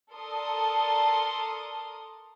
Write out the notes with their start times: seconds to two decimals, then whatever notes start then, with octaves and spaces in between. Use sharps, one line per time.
0.11 A4 A#4 D5 A5 C6 D#6